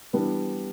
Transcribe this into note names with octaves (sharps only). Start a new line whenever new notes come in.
E3 G3 B3 D4